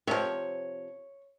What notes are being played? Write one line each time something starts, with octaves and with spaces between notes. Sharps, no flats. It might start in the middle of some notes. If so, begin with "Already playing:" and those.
C3 F3 C#5